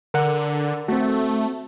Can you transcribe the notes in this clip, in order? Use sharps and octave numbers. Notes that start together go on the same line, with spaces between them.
D3 A#4 F#5
A3 C4 F#4